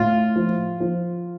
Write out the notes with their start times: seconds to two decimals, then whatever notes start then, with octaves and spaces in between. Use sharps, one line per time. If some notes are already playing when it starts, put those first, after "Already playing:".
Already playing: A2 F4
0.36 F3
0.80 F3